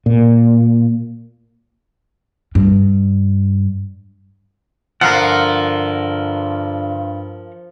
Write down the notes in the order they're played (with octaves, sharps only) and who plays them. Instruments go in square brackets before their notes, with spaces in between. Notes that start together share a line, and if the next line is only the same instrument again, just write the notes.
[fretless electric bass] A#2
[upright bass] G2
[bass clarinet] G2 [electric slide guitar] D3 F4 [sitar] F3 [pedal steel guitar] A#4 F5 F#5